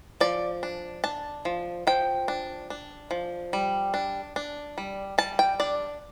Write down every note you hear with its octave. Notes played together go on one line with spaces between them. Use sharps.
F3 D5
D4
D4 A5
F3
F3 G5
D4
D4
F3
G3
D4
D4
G3
G3 A5
G5
D4 D5